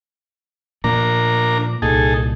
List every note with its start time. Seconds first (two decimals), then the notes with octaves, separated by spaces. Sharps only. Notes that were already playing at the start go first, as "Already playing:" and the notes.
0.84 A#2 F3 D4 A#4 A#5
1.82 C2 A#2 D#4 G#4 A4